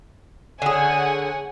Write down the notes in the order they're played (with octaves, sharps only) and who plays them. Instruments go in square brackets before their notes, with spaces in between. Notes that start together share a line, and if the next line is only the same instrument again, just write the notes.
[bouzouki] D3 G#4 [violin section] C#5 F#5 G#5